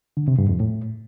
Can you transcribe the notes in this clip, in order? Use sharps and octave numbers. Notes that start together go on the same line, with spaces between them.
D3
C3
G2
F2
A2